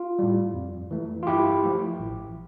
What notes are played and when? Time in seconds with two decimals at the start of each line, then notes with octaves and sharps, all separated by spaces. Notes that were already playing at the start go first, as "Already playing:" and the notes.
Already playing: F4
0.19 A2 G3
0.54 F2
0.91 E3 A3
1.23 F4
1.27 G2 E4 G4
1.63 F3 A3
2.00 A1